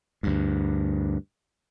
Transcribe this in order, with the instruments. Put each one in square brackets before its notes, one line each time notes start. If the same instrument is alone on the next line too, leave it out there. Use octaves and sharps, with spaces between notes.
[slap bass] D2 G2